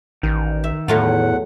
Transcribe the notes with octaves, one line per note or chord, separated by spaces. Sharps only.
A1 D#3
E5
E2 A2 F#3 A3 F4 F#5